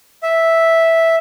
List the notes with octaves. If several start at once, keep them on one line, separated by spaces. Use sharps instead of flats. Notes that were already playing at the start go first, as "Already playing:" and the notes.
E5